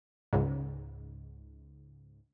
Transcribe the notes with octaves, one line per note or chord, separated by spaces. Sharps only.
C#2 G#2